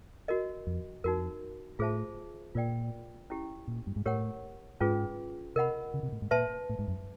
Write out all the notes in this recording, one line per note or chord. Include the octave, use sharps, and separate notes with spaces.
F#4 A#4 D#5
F2
F2 D#4 F#4 A#4
A2 F4 G#4 C5 E5 A5
A#2 F4 A#4 D5 G5
C#4 E4 G4
A#2
G2
G#2
A2 G4 A#4 C#5 F#5
G#2 C#4 F4 G#4 B4
C3 A#4 D#5 F#5 B5
C#3
C3
A2
G#2
A#2 B4 E5 A5 C6
A2
G#2
F#2